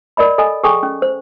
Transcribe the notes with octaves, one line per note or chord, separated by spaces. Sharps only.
A#4 D5 D#5 B5
A4 D#5 G#5
G#4 A4 G5 G#5 C#6
C#4
C5